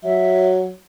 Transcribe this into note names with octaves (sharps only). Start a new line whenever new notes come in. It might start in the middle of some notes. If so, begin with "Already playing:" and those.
F#3 E5